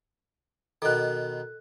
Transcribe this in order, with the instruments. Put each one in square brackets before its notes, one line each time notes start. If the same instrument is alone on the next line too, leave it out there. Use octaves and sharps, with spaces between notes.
[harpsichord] B2 D#3 [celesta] A4 F#6